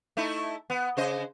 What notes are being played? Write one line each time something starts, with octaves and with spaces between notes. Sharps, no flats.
A3 D#4 E4
B3
C#3 C5 D#5